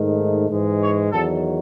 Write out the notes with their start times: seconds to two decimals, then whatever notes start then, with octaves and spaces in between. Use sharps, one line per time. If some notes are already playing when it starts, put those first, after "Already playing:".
Already playing: G#2 D#3 A3
0.50 G#2 E3 G#3
0.81 C#5
1.12 E2 D#3 F#3 A4